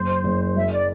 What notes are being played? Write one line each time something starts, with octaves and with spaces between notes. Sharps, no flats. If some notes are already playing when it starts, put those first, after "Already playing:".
Already playing: F#1 C5
F#1
F#2 E5
D5